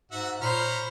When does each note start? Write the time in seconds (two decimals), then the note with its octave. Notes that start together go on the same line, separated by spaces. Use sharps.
0.11 G#2 F#4 E5 F#5
0.41 A#2 C5 C#5 A#5 B5 F6